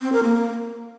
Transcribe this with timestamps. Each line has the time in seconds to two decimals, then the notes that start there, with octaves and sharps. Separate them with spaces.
0.01 C4
0.13 A#4
0.24 A#3